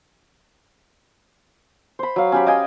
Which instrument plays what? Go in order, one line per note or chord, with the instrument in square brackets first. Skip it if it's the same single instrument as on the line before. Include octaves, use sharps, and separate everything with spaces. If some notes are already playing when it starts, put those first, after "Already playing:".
[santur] C5 B5
F#3 F5
C#4 G4 B5
D#5 F5 G5 G#5